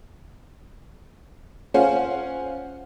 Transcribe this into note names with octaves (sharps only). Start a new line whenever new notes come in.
C#4 F4 C5 F5 F#5 G#5